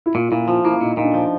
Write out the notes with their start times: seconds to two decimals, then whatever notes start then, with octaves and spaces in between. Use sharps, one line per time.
0.06 E4
0.14 A#2 F4
0.31 A#2 E4
0.48 F3 F4
0.65 A#3 E4
0.81 A#2 D#4
0.97 A#2 D#4
1.03 D4
1.14 F3